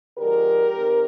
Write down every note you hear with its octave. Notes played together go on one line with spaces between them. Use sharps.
D3 F3 G#3 G4 A#4
D#3 C4